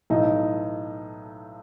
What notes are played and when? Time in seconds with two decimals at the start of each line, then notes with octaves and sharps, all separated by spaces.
0.10 B1 A2 E3 D#4